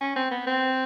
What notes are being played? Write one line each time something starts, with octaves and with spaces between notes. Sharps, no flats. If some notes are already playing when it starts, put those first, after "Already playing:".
C#4
C4
B3
C4